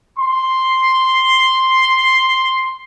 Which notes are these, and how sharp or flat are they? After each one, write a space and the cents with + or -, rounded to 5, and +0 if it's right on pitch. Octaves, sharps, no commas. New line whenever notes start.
C6 +0